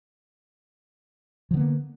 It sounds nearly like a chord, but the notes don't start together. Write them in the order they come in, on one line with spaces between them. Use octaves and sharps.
F3 D3 B3 A#3